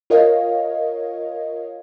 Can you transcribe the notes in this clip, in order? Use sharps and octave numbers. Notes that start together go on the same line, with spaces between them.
F4 A#4 C#5 D#5 F5